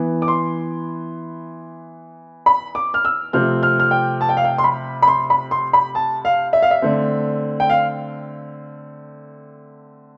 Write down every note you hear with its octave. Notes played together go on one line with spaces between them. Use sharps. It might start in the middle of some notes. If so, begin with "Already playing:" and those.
Already playing: E3 B3
D6
C6
B5
D6
F6
E6
C3 F3 A3 C4 F6
F6
F6
G5
A5
G5
F5
G5
C6
B5
B5
C6
B5
C6
B5
A5
F5
E5
F5
E5
D3 A3 C4
G5
F5